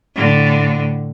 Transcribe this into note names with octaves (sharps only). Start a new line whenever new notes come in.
A2 D3